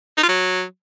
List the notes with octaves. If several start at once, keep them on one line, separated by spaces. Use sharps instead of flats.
D#4
F4
F#3